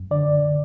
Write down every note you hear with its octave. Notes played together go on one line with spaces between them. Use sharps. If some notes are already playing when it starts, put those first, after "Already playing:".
Already playing: F#2
D3 D5